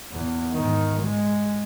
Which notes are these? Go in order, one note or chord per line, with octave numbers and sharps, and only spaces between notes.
E2
G#2 D#3
G#3